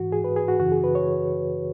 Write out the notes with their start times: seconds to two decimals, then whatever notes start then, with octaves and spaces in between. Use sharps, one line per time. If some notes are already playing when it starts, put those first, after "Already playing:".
Already playing: G#2 E3 F#4
0.12 G#4
0.24 B4
0.36 G#4
0.48 F#4
0.60 F#2 C#3 E3 F#4
0.72 G#4
0.84 B4
0.95 C#5